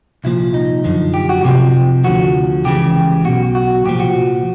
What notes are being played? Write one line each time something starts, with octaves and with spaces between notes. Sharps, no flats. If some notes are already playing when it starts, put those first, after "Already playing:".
C2 A#2 F3 E4
D#4
F#2 D3 F3
G4
F#4
C2 C3 F3 G4
D2 D3 F3 F#4
C#2 C#3 E3 G4
B1 B2 F#4
F#4
C2 A#2 F3 G4
F#4